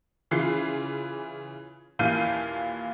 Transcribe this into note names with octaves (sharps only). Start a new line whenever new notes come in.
C#3 E3 F4 C7
D#2 A#2 E3 F5 G6 D#7